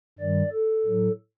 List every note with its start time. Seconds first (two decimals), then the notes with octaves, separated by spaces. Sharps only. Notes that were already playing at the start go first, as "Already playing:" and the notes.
0.19 G2 D#3 G3 D5
0.53 A4
0.85 A2 F#3